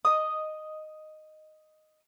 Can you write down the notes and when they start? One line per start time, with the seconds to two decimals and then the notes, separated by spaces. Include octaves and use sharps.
0.05 D#5 D#6